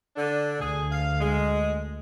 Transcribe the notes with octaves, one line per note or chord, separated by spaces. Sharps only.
D3 D4
D2 G#4
F5
G#3